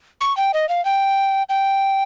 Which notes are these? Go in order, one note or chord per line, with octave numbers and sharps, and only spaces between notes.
C#6
G5
D#5
F5
G5
G5